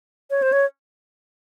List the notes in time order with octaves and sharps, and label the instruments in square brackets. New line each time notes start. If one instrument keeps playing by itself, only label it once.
[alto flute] C#5
C5
C#5